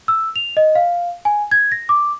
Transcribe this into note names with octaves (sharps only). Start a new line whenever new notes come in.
E6
F7
D#5
F5
G#5
G#6
A#6
D6